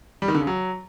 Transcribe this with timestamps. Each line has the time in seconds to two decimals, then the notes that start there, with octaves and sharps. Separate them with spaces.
0.22 G3
0.28 D#3
0.35 D3
0.41 C#3
0.47 F#3